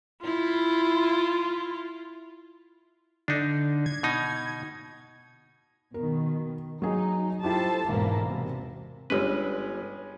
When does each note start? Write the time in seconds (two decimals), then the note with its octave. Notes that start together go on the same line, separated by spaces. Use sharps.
0.24 E4 F4
3.28 D3 D4 D#4
3.86 G#6
4.03 B2 D#4
5.94 B2 D#3 A#4
6.82 F#3 D#4 G#4
7.43 E4 F4 G4 A4 C5 A5
7.89 E1 G#2 E3 A#3
8.25 C3
9.10 G1 G3 G#3 C#4 B4